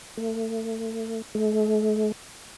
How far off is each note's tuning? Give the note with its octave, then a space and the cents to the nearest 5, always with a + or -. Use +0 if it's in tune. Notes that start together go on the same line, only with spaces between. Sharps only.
A3 +35
A3 -45